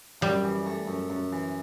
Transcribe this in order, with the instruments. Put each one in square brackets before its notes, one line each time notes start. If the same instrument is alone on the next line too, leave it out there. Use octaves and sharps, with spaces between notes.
[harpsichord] F#2 [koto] G3
[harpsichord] E3
A3
F#2
F#2
E3